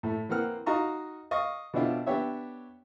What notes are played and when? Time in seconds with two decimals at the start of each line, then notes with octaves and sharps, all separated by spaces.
0.03 A2 A3
0.29 E3 A#3 C4 F#5 F6
0.66 D#4 F#4 D#5 F5 A#5 C#6
1.31 D#5 F5 C#6
1.73 B2 D3 C4 D4 E4 F4
2.06 B3 D4 G4 C#5 E5